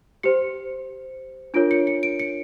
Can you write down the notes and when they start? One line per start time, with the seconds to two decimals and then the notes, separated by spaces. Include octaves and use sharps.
0.23 G4 C5 C#7
1.54 D4 F4 A#4 C#5 D7
1.71 C#7
1.87 C#7
2.03 D7
2.19 C#7